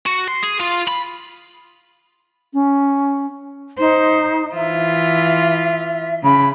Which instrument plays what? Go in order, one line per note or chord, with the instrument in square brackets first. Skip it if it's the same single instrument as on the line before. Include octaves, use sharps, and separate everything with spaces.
[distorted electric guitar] F#4
C6
G#4
F4
B5
[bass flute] C#4
[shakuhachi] D#4 [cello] C5
[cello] E3 F4 [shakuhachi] E5
[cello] C#3 [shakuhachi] B5